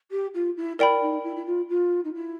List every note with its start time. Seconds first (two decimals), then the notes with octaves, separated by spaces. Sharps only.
0.11 G4
0.34 F4
0.57 E4
0.78 E4 A#4 D5 G5 B5
1.01 D#4
1.23 E4
1.36 E4
1.45 F4
1.69 F4
2.04 D#4
2.14 E4